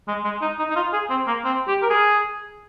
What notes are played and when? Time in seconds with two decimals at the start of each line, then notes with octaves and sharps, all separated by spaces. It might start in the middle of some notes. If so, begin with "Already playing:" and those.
0.08 G#3
0.24 G#3
0.42 D#4
0.59 D#4
0.70 D#4
0.76 F4
0.93 G#4
1.10 C4
1.27 A#3
1.45 C4
1.67 G4
1.83 A#4
1.90 G#4